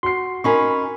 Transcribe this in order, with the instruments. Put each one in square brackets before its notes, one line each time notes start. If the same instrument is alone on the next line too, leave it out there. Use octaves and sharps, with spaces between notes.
[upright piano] F#4 C7 [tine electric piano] C6
[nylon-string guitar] C#4 D#4 A#4 [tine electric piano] G#5 B5 C#6